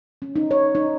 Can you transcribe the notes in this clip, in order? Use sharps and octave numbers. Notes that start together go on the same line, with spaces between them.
C#4
D#4
C#5
D#4